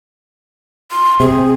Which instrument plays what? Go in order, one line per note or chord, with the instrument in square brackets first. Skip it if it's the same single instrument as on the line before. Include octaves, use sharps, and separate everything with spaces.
[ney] C6
[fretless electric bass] C3 [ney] G#4